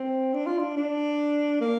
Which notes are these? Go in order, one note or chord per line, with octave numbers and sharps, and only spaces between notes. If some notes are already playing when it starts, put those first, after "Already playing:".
Already playing: C4
D4
F4
D4
D4
A#3